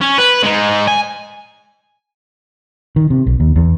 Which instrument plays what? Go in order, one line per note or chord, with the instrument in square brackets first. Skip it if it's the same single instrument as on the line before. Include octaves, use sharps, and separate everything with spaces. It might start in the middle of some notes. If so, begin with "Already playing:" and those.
[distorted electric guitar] C#4
B4
G#3 D#4
G#5
[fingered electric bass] D#3
C3
B1
D#2
E2